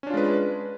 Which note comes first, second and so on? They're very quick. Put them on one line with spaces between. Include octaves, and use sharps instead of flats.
C#4 D4 F4 G#3 B4